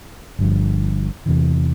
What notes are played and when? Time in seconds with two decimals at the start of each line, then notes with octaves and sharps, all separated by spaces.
0.39 G1 G2 F3
1.26 E2 C3 E3